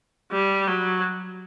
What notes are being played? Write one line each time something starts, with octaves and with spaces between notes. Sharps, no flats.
G3
F#3